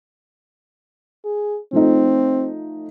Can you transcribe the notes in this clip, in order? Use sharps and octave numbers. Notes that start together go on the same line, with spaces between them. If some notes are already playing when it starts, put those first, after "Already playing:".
G#4
F3 A3 C4 D#4